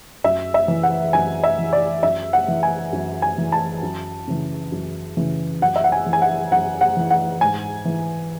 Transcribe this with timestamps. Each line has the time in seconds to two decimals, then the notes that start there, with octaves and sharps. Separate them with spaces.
0.24 F#2 E5
0.54 E5
0.68 E3
0.83 F#5
1.13 F#2 G#5
1.43 E5
1.59 E3
1.73 D5
2.03 F#2 E5
2.33 F#5
2.48 E3
2.63 G#5
2.93 F#2
3.22 G#5
3.38 E3
3.52 A5
3.83 F#2
4.27 C#3 E3
4.72 F#2
5.17 C#3 E3
5.61 F#2 F#5
5.76 E5
5.84 F#5
5.92 G#5
6.06 E3
6.13 G#5
6.22 F#5
6.51 F#2 F#5
6.81 F#5
6.97 E3
7.10 F#5
7.41 G#2 G#5
7.85 E3